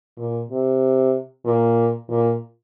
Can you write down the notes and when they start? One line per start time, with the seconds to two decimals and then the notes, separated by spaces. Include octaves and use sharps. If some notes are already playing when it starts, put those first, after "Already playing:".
0.17 A#2
0.49 C3
1.45 A#2
2.09 A#2